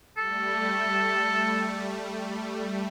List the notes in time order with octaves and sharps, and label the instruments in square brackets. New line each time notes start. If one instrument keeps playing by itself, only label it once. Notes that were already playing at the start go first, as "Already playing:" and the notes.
[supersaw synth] G3 A3 [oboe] A4